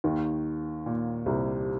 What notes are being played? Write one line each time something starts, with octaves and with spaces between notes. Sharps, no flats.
D#2 D#3
A#2
C2 C3